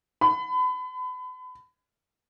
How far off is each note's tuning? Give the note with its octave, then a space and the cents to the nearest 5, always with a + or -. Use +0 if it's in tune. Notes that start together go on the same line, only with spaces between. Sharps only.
B5 +35